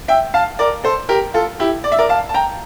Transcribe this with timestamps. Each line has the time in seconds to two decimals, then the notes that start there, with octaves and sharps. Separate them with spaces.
0.08 E5 G5
0.34 F5 A5
0.59 A#4 D5
0.84 A4 C5
1.09 G4 A#4
1.34 F4 A4
1.60 E4 G4
1.84 D5
1.92 E5
1.98 A#4 D5
2.09 F5 A5
2.29 A5
2.34 G5 A#5